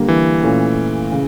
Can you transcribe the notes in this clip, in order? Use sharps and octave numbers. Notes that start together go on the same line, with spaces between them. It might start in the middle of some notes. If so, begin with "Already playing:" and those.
Already playing: D3 G3 A#3
E3
A#2 A3 C#4
C#3